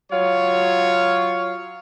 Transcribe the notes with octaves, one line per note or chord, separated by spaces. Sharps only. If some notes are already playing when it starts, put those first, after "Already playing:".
F#3 F4 C#5